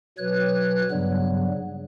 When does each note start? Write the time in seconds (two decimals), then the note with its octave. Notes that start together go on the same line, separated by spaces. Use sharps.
0.18 B2 F#3 B4 C#5 F#6
0.91 G2 C#3 F#3 G3 B3